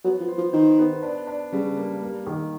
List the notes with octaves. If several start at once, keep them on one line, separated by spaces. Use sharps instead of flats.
F#3 B3
F3
C5
F3
D#3 C5
B3
D4
D4
C#3 G3
A#3
A#3
D#3